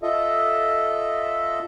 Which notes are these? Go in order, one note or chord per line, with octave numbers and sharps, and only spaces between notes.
F4 A4 D#5 E5